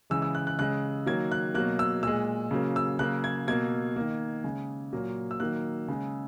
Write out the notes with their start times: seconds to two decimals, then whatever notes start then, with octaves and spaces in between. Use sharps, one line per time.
0.10 C#3 E3 G#3 E6
0.22 E6
0.35 F#6
0.47 F#6
0.59 C#3 G#3 F#6
1.06 D#3 F#3 A#3 G#6
1.32 F#6
1.54 B2 F#3 A#3 F#6
1.79 E6
2.03 A#2 G#3 E6
2.51 C#3 F#3 A#3
2.76 E6
2.99 C#3 F#3 A#3 F#6
3.24 G#6
3.47 B2 A#3 G#6
3.96 D#3 A#3
4.44 C#3 G#3
4.93 A#2 F#3 A#3
5.31 E6
5.40 D#3 F#3 A#3 F#6
5.88 C#3 G#3